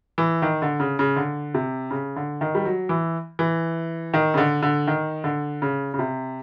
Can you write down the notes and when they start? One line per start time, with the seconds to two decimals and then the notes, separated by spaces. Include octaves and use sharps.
0.18 E3
0.42 D#3
0.62 D3
0.80 C#3
0.99 C#3
1.16 D3
1.54 C3
1.91 C#3
2.16 D3
2.41 D#3
2.55 G3
2.65 F#3
2.89 E3
3.39 E3
4.14 D#3
4.34 C#3
4.37 D3
4.62 D3
4.87 D#3
5.24 D3
5.62 C#3
5.94 C#3
5.99 C3